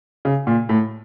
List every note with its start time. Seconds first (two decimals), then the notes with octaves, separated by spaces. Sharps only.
0.25 C#3
0.47 A#2
0.69 A2